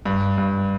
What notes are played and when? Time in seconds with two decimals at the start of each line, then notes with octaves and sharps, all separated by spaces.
0.05 G2
0.38 G2